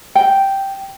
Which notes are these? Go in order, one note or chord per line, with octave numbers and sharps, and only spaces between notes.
G5